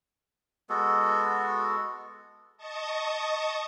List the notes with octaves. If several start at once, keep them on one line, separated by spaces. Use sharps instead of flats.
G#3 B3 F#4 A4
D#5 A5 C#6 D#6